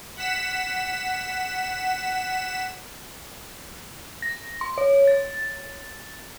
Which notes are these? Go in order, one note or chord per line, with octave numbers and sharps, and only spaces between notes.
F#5 B6 E7
A#6
C6
C#5
A6